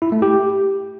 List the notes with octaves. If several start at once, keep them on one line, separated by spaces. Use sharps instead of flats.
E4
A3
G4